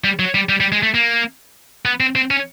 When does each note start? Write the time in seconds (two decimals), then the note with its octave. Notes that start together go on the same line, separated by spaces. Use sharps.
0.04 G3
0.19 F#3
0.35 G3
0.49 G3
0.60 G3
0.72 G#3
0.83 A3
0.94 A#3
1.85 B3
2.00 C4
2.15 C4
2.31 C#4